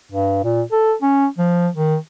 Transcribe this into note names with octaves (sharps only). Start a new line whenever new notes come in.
G2
A#2
A4
C#4
F3
D#3